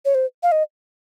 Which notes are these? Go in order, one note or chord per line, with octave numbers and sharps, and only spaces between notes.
C#5
C5
F5
D#5